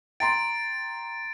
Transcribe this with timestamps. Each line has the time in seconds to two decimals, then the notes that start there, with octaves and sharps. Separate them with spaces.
0.20 G5 A#5 C6 A6 D7